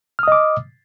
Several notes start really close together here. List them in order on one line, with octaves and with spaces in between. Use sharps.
F6 D#6 D#5 D6